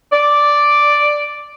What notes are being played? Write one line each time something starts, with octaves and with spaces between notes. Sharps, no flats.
D5